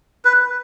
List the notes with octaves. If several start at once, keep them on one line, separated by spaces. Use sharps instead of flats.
B4